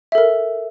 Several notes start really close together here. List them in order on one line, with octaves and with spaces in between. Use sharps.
E5 A4 A#4